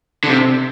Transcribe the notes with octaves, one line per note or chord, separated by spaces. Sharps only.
D3
C3